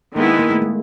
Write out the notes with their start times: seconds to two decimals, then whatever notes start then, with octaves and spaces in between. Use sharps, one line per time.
0.16 D#3 G#3 A#3 B3 E4
0.39 A#3
0.50 A3
0.62 G#3